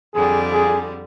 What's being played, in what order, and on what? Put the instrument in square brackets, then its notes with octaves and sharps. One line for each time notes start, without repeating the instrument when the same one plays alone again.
[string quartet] F2 D3 G3 [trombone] G#4
[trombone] G#4